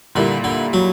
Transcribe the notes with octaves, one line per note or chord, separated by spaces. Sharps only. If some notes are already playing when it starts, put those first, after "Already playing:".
A#2 D3 G3 A#3 E4
D3
F#3